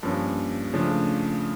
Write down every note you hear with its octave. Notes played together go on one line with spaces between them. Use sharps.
G2 F3 A#3 C#4 A5
C#3 F3 A3 D4